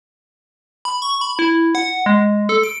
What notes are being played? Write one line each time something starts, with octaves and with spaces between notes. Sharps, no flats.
B5
C#6
B5
E4
F#5
G#3
A4
D7